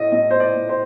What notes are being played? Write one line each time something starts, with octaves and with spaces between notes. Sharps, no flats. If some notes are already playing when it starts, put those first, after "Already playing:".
Already playing: A2 A3 D#5
A2 D#5
C5
D5
A3
C5